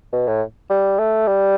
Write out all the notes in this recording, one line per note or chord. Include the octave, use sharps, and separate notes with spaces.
B2
A2
G3
A3
G3